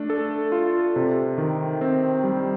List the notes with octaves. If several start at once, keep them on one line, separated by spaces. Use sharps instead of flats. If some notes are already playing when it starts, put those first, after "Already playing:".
Already playing: A3 D4
A4
F4
C3
D#3
C4
G3